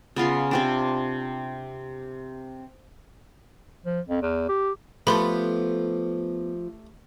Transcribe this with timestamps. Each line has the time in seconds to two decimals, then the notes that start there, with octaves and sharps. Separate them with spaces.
0.16 C#3 B3 F4 C6
0.51 C3 C4 D4
3.85 F3
4.08 F2
4.22 E2
4.49 G4
5.07 F3 A3 B3 G4 A4 C5 B5 C6